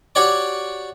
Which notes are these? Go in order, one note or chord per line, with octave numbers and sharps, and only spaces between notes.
F#4 G4 C#5 D5 D6